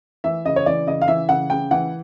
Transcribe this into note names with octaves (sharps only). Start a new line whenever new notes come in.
E3 E5
C#3 D#5
C#5
E3 D5
C#3 D#5
F5
E3 E5
C#3 F#5
C#3 G5
E3 F#5